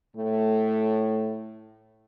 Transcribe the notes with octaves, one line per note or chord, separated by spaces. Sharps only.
A2 A3